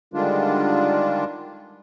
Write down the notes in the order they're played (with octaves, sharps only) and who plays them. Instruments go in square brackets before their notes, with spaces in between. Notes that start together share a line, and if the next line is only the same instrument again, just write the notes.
[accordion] D3 D#3 G3 G#3 D4 F4